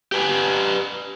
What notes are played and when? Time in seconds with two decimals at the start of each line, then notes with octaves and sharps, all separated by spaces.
0.12 G4 B4 G#5